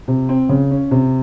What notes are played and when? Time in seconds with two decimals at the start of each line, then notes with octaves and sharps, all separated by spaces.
0.08 C3
0.29 C4
0.49 C#3
0.71 C#4
0.91 C3